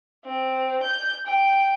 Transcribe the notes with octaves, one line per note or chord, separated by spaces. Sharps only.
C4
G6
G5